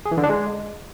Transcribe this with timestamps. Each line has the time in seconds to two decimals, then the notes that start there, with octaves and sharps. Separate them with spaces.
0.06 G#4
0.12 E3
0.17 D3
0.23 D4
0.29 G#3